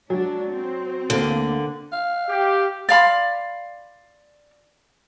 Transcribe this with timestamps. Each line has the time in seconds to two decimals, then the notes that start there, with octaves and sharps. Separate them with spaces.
0.10 F#3 G#3 D4
0.53 C4
1.10 D2 D3 A#3 C5
1.92 F5
2.27 G4
2.89 D5 F5 B5 C6